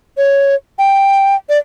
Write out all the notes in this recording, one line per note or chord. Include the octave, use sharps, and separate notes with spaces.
C#5
G5
D5